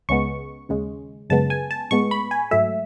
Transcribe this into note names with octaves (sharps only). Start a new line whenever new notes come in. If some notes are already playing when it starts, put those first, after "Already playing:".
C#2 C#3 G#3 B3 C#6
D#2 C#3 G#3
F#2 C#3 G#3 B3 A5
G#5
A5
A2 G#3 B3 C#6
B5
G#5
G#2 F#3 A3 E5